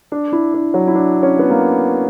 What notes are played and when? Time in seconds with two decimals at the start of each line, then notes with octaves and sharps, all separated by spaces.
0.12 D4
0.32 E4
0.54 D4
0.74 F#3
0.88 E4
0.95 D4
1.23 C#4
1.39 B3
1.50 A#3